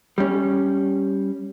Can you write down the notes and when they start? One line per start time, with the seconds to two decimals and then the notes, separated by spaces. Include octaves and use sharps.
0.18 G3 C#4